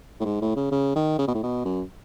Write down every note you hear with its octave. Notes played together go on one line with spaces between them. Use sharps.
A2
G#2
A2
C#3
C#3
D#3
C#3
B2
A2
B2
F#2